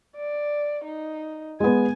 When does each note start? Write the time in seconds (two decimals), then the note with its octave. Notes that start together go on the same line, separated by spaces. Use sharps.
0.16 D5
0.84 D#4
1.60 G#3 B3 G#5